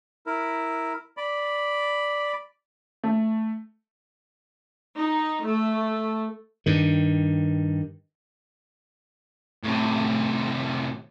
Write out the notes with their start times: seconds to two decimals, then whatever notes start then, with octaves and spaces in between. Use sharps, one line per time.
0.26 E4 A#4
1.17 D5 B5
3.04 A3
4.98 D#4
5.44 A3
6.66 G2 D#3
9.63 A2 C3